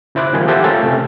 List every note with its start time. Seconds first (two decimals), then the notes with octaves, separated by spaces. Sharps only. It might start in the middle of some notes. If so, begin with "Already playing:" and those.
0.15 C#3 E4 C5 D6 F#6
0.33 D#3 F3 G#3 A#3 G4 G#4
0.48 G4 A4 C5 E5 F#5 G#5
0.64 A3 C#4 F4 A4 A#4
0.83 C3 A3